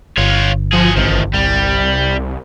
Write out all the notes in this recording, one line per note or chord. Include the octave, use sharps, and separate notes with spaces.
G1 F4 C#5
F3 F#4 G#4
A1 D#3 F3
C2 G3